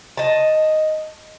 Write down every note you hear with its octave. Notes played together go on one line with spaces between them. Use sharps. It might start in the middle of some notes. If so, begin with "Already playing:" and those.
D#5 A5